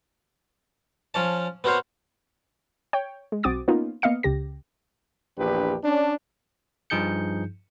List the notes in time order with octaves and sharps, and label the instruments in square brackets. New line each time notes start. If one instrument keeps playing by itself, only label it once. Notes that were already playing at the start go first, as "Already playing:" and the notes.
[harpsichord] F3 C#4 C#5 A5
B3 C4 F#4 A#4 C5 C#5
[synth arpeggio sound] C#5 G5
G#3
B1 C4 F#4 D6 D#6 A6
A#3 B3 C#4 D#4 F4
A#3 B3 D#5 F5 C#7
C#2 C#3 G4 A#6
[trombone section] A#1 E2 D4 G4 B4
C#4 D4
[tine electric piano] G2 F3 D#4 G#4 G6 C#7